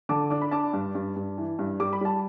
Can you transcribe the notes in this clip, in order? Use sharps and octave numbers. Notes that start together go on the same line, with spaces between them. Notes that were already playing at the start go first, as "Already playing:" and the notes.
D3 A5 D6
D4 D6
B5
D4 A5 D6
G2
G2
G2
E3
G2
G3 D6
B5
G3 A5